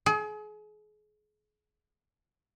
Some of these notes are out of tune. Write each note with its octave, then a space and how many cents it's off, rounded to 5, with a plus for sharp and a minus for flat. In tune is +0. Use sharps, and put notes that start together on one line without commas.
G#4 +35